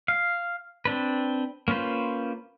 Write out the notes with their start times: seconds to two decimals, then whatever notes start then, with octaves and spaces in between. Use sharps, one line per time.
0.08 F5
0.85 C4 D4 B4
1.68 A#3 C#4 F4 B4 C5